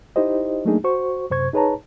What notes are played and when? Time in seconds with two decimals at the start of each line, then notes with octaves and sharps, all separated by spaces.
0.16 D#4 E4 G4 C5 D#5
0.65 F#3 A3 A#3 D4 D#4 G#4
0.84 F#4 C5 C#6
1.30 F#2 C3 C5 C#6 G#6
1.53 D#4 G#4 B4 C#5 A5 A#5